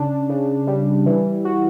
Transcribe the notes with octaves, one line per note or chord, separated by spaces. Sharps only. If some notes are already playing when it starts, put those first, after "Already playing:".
Already playing: C#3 D4
C#3
G3
E3
F#4